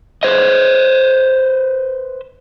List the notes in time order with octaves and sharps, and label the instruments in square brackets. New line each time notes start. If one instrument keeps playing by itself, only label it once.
[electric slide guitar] B4 C5 D#5